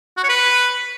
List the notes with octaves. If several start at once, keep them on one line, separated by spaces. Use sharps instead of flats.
F#4
C#5
B4